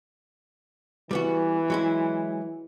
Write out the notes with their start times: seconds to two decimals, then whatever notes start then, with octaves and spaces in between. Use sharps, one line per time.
1.11 E3 G3 B3 F#4
1.70 F#3 G#3 E4